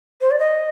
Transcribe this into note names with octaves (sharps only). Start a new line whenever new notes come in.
C5
D5
D#5